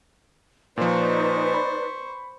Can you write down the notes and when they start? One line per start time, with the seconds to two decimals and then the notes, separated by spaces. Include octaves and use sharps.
0.77 A#2 F3 D#4 B4 C5 D5 C#6
1.54 B5